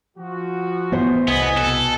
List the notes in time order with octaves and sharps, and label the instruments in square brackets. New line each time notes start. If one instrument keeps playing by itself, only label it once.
[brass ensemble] F3 F#4
[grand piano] E2 A2 C5 [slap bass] B3
[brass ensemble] F#1 D#5 G#5 [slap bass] C2 [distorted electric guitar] B3
[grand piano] B2 F#6 [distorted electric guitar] A4